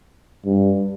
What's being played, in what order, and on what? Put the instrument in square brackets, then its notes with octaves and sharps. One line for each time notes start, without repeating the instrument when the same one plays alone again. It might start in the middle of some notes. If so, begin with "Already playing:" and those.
[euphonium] G2